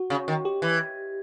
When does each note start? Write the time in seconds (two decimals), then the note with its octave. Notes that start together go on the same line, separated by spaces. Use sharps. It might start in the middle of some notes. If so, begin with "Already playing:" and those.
Already playing: F#4
0.10 C#3
0.28 D#3
0.45 G4
0.62 E3